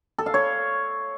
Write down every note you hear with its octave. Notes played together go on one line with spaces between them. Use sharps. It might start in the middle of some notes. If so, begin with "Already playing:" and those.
A4
F5
C#5